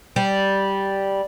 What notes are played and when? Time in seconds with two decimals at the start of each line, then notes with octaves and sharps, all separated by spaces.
0.16 G3